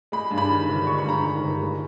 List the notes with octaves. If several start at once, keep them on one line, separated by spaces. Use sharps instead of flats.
G#3 B5
G2
B5
D#3
G1
G#3 C#6
B5
G2 A#5
B5
D#3
G1
G#3